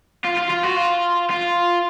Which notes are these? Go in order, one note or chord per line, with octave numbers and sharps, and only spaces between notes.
F4
F4
F4
F#4
F4
F4